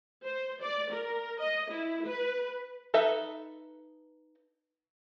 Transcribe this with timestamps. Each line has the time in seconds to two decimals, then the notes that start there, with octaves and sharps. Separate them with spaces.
0.25 C5
0.62 D5
0.91 A#4
1.40 D#5
1.70 E4
2.04 B4
2.94 D#4 A4 B4 E5